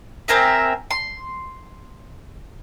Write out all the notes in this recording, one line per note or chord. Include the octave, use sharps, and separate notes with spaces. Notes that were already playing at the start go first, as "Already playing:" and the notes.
C4 G#4 A#4 E5
C6